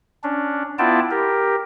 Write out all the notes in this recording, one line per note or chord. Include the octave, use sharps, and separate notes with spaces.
C#4 D4
B3 E4 F4 D5 G5 A5
G4 A#4